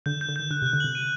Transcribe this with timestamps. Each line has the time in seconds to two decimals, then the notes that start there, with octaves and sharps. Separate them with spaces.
0.06 D3 G6
0.21 G6
0.29 D3
0.36 D#3 G6
0.51 D3 F#6
0.62 C3 F#6
0.73 D3
0.80 C3 F#7
0.95 D#7